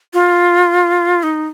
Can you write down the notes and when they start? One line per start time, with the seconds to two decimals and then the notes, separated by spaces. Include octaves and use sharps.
0.14 F4
1.23 D#4